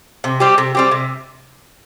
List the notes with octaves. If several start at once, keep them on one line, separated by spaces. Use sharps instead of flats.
C3
G3 C4 G4
C3
G3 C4 G4
C3